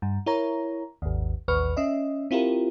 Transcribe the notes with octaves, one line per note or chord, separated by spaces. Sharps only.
G2
E4 A#4 C#5 A#5
G#1 D#2
A1 D#2 B4 C#6 F6
C#4 D#5 E5
C4 E4 F4 G4 A#4